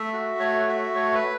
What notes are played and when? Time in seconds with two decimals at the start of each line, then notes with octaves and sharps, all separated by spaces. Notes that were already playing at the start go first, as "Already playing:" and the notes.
Already playing: A3 E5
0.13 F#4
0.40 A3 C#5
0.68 F#4 E5
0.95 A3 C#5
1.14 B4